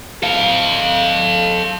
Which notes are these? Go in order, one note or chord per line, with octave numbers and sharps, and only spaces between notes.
A4 F5